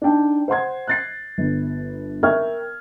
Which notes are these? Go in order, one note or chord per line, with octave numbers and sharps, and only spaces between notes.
D4 D#4 G5 A5
C5 F#5 C6 G#6
F#6 A6 C7
G1
A#4 E5 G5 C#6 F6 G#6